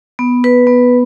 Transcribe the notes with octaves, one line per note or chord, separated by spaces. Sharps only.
B3
B4
B3